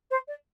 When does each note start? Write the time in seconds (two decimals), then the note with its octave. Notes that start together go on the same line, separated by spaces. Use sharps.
0.10 C5
0.27 D5